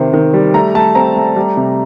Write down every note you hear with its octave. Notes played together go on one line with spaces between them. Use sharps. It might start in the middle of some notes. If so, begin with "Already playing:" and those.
Already playing: C3 D#3 C5
D#3
G3
A3 A#5
A3 A5
C4 A#5
A3
G3
C3